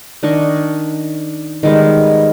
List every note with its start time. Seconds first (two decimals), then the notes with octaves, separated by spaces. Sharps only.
0.23 D#3 D4 D#5 C#6
1.63 D#3 G3 G#3 B3